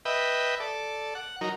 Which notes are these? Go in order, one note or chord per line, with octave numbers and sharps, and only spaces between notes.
B4 D#5 E5 G5
A4 D5
F#5
F#3 D#4 A#4